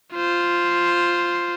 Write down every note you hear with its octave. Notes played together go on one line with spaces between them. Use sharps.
F4 C5